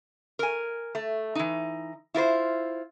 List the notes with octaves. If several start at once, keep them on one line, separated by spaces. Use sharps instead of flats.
A#4 G#5
A3
E3 D#4
E4 F4 B4 C5